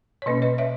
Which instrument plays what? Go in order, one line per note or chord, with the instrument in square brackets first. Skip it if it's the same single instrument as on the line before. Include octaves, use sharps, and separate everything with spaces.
[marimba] C#5
B2 A#3 C#4 B4 D#5
B4 D#5
C#5 E5